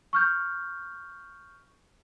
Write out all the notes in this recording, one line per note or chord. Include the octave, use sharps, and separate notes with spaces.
C#6 F6 G6